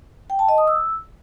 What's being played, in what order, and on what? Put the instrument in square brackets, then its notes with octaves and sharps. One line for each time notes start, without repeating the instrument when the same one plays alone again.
[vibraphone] G5
A5
D#5
D#6
E6